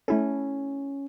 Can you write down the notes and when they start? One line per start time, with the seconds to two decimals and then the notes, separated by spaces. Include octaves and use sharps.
0.08 A3 C#4 E4 A4